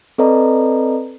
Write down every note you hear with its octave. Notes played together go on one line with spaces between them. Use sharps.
C4 A4 B4 D5 D#5 A#5